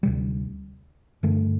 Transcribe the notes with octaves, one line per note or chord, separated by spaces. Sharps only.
D2 C3 G3
G2 D3 A3